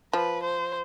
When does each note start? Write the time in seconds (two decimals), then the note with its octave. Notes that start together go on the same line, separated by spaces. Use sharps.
0.13 F3 B4
0.43 C5